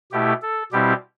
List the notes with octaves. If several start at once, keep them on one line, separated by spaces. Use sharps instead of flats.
B2 A3 E4 G4
A4
B2 G3 C4 E4 G4